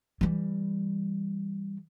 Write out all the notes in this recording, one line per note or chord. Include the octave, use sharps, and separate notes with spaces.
E3 G3